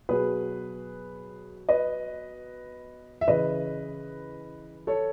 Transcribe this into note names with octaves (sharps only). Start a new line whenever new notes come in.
B2 F#3 G#4 B4
B4 D#5
E5
C#3 E3 B4 D#5
A4 C#5